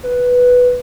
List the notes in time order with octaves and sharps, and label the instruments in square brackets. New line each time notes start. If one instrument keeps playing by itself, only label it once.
[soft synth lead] B4